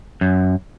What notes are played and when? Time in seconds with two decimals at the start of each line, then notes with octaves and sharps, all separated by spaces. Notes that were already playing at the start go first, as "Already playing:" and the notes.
0.21 F#2